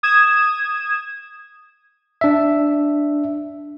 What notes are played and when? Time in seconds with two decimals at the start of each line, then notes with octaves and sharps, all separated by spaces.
0.03 D#6 G#6 E7
2.21 D4 E5